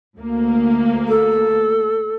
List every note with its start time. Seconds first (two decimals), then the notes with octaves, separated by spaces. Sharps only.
0.18 D2 A#3
1.08 A4